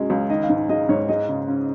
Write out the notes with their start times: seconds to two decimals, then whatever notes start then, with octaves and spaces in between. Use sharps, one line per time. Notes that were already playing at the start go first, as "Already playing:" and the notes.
Already playing: F#2 B2 G#3 C#4
0.10 C#2
0.30 D#3 D#5
0.43 F5
0.50 G#2
0.69 G#3 D#5
0.89 G#2 C#5
1.09 G#3 D#5
1.28 C#3
1.48 C#4